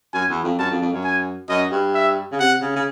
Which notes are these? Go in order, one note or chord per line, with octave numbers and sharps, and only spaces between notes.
F#2 G#5
E2
F2
F#2 A5
F2
F2
F#2
G#5
F#2 D#5
G2
E5
C#3
C3 F#5
C#3
C#3